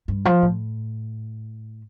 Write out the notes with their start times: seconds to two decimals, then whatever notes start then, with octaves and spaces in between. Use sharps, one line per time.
0.08 G2
0.25 F3
0.42 A2